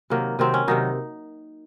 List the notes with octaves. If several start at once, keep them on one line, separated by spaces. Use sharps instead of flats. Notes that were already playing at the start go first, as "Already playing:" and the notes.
C3 D#3 F#3 A#3
C3 D#3 F#3 C4
C#4
C3 D#3 F#3 D#4